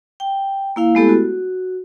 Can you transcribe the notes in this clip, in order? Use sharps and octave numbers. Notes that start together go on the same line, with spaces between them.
G5
A#3 E4 F5
G#3 A3 B3 E4 G4 A4
F#4